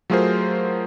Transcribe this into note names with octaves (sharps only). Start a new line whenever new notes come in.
F#3 A3 F4 G#4 A#4 C5